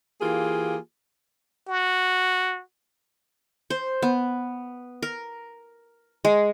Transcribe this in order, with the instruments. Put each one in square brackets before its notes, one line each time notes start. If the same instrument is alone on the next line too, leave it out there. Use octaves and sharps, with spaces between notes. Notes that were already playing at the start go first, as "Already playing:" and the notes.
[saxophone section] E3 A#3 F4 G4 G#4
[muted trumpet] F#4
[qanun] C5
B3
A#4
G#3